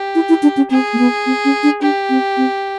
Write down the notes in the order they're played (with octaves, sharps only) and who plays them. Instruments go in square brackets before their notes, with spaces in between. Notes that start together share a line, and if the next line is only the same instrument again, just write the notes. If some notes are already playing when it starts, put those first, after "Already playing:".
Already playing: [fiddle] G4
[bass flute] E4
E4
D4
C#4
[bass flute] C4 [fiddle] G#4
[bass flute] A#3
B3
C4
C#4
D4
[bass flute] D4 [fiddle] G4
[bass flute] C4
C4